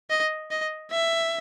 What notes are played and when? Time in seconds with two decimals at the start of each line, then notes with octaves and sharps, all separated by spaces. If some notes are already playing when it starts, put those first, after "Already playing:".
0.10 D#5
0.51 D#5
0.92 E5